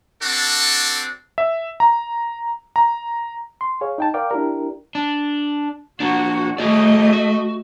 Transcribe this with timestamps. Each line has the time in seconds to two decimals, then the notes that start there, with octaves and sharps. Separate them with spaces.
0.21 C4 D4 F#4 A4
1.38 E5
1.80 A#5
2.76 A#5
3.61 C6
3.81 G#4 C#5 F5
3.98 D#4 G5 A5
4.14 A#4 D5 F5 G5 D6
4.31 D4 E4 G4 A#4
4.95 D4
6.00 A#3 D4 F#4
6.58 A3 F#4 G#4 D5 D#5
7.13 F#4